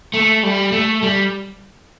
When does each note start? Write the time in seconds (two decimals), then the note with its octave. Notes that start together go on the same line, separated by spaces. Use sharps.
0.14 A3
0.43 G3
0.72 A3
1.03 G3